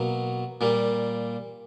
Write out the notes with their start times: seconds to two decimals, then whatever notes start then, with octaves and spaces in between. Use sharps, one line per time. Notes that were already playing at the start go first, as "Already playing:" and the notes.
Already playing: B2 F#3 A#3
0.61 A#2 G3 A#3